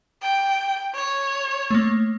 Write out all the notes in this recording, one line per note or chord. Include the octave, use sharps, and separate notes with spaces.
G5
C#5
A3 A#3